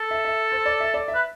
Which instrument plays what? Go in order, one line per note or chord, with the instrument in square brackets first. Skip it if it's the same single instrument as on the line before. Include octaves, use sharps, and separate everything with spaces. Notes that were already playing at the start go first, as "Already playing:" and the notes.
Already playing: [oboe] A4
[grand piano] E5
E5
C5
D5
E5
D5
E5
[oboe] B4